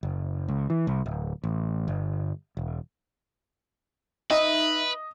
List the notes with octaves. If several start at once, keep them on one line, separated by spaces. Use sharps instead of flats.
F#1
C#2
E3
C2
D1
A1
G1
E1
D#4 B4 D#5 E5